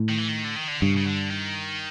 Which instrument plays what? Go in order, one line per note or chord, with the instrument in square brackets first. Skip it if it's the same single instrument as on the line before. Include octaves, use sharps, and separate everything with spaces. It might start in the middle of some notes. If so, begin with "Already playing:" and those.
Already playing: [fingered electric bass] A2
[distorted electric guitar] D#3
E3
D#3
D3
D#3
D3
[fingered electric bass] G2 [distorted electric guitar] C#3
[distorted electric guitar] C#3
D3
D#3